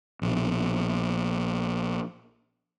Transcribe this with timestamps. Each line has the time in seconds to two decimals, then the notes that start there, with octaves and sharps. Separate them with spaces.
0.22 A#1 B2